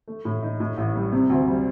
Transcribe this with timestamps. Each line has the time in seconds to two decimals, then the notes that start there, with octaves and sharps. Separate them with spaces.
0.08 A3
0.25 A2
0.43 D#4
0.60 A2
0.78 A1
0.95 G3
1.12 C3
1.30 D2
1.48 G3